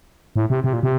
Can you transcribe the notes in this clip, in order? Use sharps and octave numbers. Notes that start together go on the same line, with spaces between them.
A2
C3
C3
A#2
C3